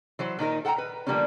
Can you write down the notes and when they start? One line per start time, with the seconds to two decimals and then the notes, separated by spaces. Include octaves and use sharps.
0.19 E3 F#3 C5
0.39 A#2 D#3 D#4 A#4
0.65 A4 F#5 G5 A5 A#5
0.78 B4
1.07 D3 F3 G3 A#3 B3 C#4